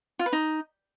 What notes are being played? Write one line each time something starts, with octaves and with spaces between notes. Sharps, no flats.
F4
B4
D#4